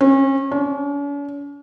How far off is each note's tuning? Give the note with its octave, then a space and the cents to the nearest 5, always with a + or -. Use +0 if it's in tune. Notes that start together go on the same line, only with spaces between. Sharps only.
C#4 -35
C#4 +45